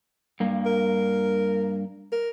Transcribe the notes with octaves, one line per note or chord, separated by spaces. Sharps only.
G2 A#3
A#4
A#4